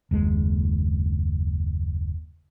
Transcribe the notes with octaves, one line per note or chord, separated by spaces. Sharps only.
F#1 D#2 G#3